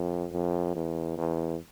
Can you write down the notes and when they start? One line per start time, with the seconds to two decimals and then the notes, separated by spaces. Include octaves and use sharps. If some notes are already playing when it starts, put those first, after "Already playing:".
Already playing: F2
0.32 F2
0.75 E2
1.18 E2